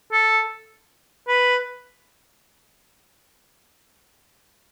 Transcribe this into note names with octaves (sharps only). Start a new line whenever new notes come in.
A4
B4